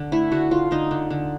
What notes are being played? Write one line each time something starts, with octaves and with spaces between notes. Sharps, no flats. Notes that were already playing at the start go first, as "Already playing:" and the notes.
Already playing: D3
A3 E4
D3 F#4
D3 F4
D3 D#4
D3
D3